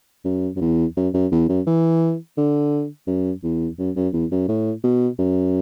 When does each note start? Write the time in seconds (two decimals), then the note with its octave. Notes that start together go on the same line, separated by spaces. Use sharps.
0.25 F#2
0.56 F#2
0.61 E2
0.96 F#2
1.14 F#2
1.32 E2
1.49 F#2
1.66 E3
2.37 D3
3.07 F#2
3.43 E2
3.78 F#2
3.96 F#2
4.13 E2
4.31 F#2
4.48 A2
4.84 B2
5.19 F#2